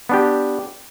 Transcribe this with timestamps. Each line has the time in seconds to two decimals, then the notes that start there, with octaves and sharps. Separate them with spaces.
0.09 B3 D4 G4